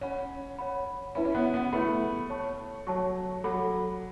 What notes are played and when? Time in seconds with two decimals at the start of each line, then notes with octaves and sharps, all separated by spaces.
0.01 C#4 C#5 F#5 B5
0.59 C#5 F#5 B5
1.15 C#4 E4 B4 E5 B5
1.25 C#4
1.35 B3
1.54 B3
1.73 A3 E4 B4 E5 B5
2.30 C#5 A5 C#6
2.87 F#3 C#5 A5 C#6
3.44 F#3 A4 F#5 B5